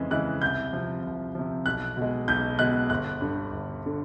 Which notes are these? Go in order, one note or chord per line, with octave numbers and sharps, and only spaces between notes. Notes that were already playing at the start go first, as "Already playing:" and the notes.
Already playing: F2 C#3 E3 G#3
C#3 E3 G#3 F#6
C2 G6
C3 F3
C2
C3 F3
B1 F#6
B2 G#3
B1 G6
B2 G#3 F#6
G1 F#6
G2 D3
G1
D3